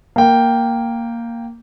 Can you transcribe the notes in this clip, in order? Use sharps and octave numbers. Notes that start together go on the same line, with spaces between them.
A#3 G5